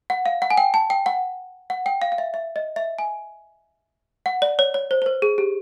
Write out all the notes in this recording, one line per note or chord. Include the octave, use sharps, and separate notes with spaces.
F#5
F5
F#5
G#5
G5
A5
G5
F#5
F#5
G5
F5
F5
E5
E5
D#5
E5
G#5
F#5
D5
C#5
C#5
C5
C5
B4
G#4
G4